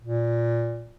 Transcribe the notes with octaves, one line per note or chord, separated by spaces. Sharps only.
A#2